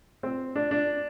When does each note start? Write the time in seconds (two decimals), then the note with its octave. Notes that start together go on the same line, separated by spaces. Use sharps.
0.23 C4
0.56 D4
0.71 D4